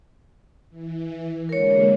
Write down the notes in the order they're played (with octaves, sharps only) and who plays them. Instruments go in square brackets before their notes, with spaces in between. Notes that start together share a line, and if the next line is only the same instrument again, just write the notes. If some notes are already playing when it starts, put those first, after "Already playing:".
[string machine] E3
[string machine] D3 G#3 A#3 [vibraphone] A#4 C#5